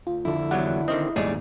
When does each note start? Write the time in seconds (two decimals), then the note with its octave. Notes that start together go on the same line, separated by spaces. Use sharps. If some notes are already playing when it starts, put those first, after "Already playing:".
0.07 D2 F4
0.25 F2 D3 E4
0.51 E2 F#3 G3 F#5
0.88 D3 D#3 C4 D#5
1.16 A#1 D#2 G#2 G3 A3 G#4 C#5 D5